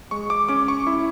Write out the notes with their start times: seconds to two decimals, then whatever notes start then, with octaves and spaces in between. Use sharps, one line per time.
0.11 G#3 C#6
0.30 D6
0.49 C#4 D6
0.68 C#6
0.87 E4